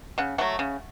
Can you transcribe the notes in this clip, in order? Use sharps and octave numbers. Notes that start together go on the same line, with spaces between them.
C#3 F#5
F#3 A3 F#5
C#3